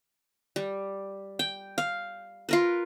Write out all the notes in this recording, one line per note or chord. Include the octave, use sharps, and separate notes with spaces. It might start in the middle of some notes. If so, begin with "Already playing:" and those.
G3
G5
F5
F4 A#4 B4